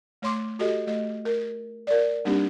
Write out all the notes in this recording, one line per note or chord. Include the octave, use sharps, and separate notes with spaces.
A3 C#5 C6 D6
F#4 G4 A4 D#5
A3 D#5
A#4
A#4 D5
G3 A#3 C4 D4 D#4 G4